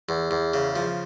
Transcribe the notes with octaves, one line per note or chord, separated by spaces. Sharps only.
E2
E2
C#3
F3